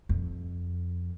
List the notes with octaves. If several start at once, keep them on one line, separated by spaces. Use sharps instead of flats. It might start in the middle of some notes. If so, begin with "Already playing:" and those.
F2